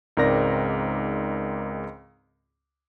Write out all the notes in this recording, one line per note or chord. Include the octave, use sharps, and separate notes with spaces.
C#2 G#2 C4 A#4 D5 A#6